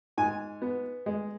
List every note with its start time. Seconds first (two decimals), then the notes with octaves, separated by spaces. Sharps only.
0.18 G#2 G#5
0.62 B3
1.06 G#3